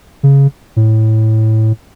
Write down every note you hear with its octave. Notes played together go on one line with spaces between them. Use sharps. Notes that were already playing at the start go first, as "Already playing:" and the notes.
C#3
A2